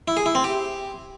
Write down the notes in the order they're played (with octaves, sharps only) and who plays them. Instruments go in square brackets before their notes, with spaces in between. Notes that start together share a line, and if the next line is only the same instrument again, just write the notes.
[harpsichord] E4
G#4
E4
C4
G4